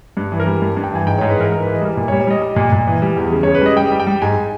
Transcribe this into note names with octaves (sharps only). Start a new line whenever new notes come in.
G2
E3
A#4
G3
G2
G2
G5
E3 G#5
G#2 G5
G#2 C#5
B4
E3 A#4
G#2 A#4
E3 B4
D#5
G3 A#4
A#2
C#5
G3
C#5
G3 D#5
G3
A#2
A#2
E3
G3
E2
C#3
C#3 C#5
B4
G3 D#5
G3 G5
G3
G5
G3
G#2 G#5